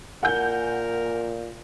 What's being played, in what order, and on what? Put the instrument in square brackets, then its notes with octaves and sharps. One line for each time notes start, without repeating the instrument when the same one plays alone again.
[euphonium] A#2 [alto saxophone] A#4 [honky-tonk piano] F#5 G#5 G6